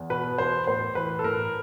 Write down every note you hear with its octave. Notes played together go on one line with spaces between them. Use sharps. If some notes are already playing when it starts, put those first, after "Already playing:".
Already playing: E2
B2 B4
E2 C5
A2 C5
E3 B4
A4
A2 A#4